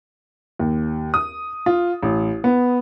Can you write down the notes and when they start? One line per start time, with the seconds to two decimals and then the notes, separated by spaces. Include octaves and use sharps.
0.59 D#2
1.14 D#6
1.66 F4
2.03 A1
2.44 B3